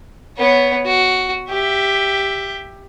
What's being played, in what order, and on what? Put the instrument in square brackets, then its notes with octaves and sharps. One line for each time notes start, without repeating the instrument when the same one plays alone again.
[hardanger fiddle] B3 C#5
F#4
G4 E5